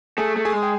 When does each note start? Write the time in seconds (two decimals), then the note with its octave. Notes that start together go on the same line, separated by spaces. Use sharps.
0.18 A3 G#4 G#5
0.36 A3
0.45 G#4 G#5
0.53 G#3
0.63 G5